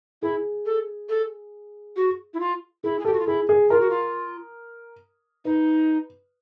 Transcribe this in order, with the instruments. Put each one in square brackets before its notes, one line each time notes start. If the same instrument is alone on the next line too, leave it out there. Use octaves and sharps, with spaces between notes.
[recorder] E4 [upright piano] G#4
[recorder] A4
A4
F#4
E4
F4
[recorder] E4 [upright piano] G#4
[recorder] G#4
[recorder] G4 [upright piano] A4
[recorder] F#4
F4
[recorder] E4 [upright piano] G#4
[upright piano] G#4
[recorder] F4 [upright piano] A#4
[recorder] F#4
F4
[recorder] D#4 [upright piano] B4